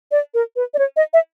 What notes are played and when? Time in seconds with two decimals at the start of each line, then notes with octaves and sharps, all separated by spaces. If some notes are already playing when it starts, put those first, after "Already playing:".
0.11 D5
0.34 A#4
0.56 B4
0.74 D5
0.79 C#5
0.96 D#5
1.13 E5